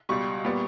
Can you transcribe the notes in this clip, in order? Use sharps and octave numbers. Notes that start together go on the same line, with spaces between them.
C#2 B2 G3 C#6
A#2 G3 B3